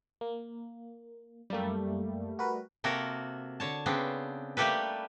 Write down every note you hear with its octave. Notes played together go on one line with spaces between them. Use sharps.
A#3
F#2 G3 A3 A#3
F#4 A#4 B4
C3 A#3 F#4 A4 A#4
D3 C#5 A5
C#3 B3 C4 D4
G3 A3 A#3 G4 A4 B4